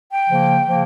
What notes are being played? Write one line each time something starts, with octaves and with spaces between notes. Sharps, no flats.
G5
C#3 F3 A#3
C#3 F3 A#3